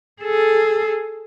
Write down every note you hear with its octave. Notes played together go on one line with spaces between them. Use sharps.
G#4 A4